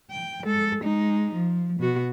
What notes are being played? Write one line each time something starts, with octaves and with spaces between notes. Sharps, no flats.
G5
G#3 A4
G#3 D#4
F3
B2 F#4